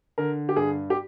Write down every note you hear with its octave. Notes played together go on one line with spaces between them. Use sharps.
D3 A#4
G4
G2 G#4
G4